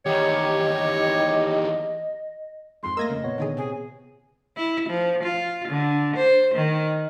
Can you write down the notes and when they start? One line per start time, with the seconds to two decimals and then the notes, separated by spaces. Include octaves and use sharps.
0.06 E2 D#3 G4 C#5 D#5
2.83 F2 G#2 C6
2.97 A3 A#3 A#4 D#5 E6 G#6 A#6
3.09 F2 C#3
3.23 A#2 B3 C#5
3.38 D3 D#3 G#4
3.57 C3 G#4
4.57 E4
4.90 F3
5.23 F4
5.69 D3
6.16 C5
6.55 D#3